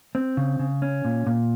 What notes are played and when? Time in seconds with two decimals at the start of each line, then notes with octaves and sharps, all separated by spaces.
0.15 C4
0.37 C#3
0.59 C#3
0.82 C#4
1.05 A#2
1.27 A#2